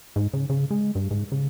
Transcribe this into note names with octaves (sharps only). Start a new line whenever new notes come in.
G#2
C#3
C#3
G#3
G2
G#2
C#3